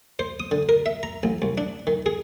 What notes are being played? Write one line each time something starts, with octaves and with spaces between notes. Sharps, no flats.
C5
D#6
D3
A#4
E5
A#5
A1
C2
D4
D#3
G#4